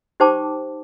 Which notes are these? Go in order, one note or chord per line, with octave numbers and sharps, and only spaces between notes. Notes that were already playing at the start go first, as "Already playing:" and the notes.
D#4 G4 C5 G5 A5 D6